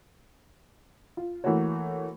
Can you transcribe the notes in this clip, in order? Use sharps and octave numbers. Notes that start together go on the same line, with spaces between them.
F4
E3 A3 A#3 F#4 C#5